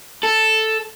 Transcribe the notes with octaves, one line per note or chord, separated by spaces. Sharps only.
A4